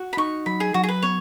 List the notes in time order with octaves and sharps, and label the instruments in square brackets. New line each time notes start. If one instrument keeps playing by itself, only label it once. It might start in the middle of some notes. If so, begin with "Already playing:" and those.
Already playing: [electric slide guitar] F#4
[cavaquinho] B5
[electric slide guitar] D#4 [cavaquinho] C#6
[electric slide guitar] F#3 [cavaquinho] B5
[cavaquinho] G#4
[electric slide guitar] F#3 [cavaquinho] F#4
[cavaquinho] G#4
B4
[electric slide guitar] B3 [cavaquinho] C#5